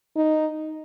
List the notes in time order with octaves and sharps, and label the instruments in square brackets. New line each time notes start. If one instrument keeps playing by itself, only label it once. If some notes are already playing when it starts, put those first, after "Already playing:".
[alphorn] D#4